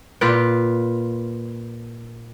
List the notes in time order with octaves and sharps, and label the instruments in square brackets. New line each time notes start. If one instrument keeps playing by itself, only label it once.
[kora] A#2 F4 B4 G5